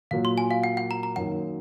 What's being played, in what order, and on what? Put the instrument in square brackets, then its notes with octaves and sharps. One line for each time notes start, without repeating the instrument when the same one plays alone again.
[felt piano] A#2 F#3 A#3 F4 A#4 [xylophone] F5
[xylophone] C6
G#5
F5
F#5
F#5
A#5
A#5
[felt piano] F#2 D#3 F#3 A#3 [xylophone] F#5